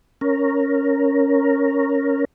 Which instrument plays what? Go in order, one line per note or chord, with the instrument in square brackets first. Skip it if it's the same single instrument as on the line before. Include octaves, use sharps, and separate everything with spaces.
[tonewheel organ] C#4 A#4